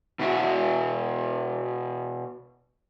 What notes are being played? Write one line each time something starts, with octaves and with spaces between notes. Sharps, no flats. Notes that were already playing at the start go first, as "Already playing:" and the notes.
B2 E4 F#4